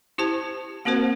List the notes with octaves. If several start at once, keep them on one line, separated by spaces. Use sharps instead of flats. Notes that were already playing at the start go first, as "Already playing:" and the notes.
E4 G4 C5 A5
A#3 C4 F#4 A#4 C5 F#5